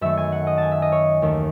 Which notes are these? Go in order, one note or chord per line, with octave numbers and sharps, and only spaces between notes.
F#2 D#3 A3 E5
G#5
F#5
D#5
G#5 A5
E5
D#5
C#5
D#2 D#3 A3